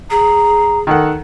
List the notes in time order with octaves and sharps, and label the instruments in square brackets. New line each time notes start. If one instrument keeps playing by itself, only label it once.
[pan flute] G#4 [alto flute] A#5
[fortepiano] D#3 A4 F#5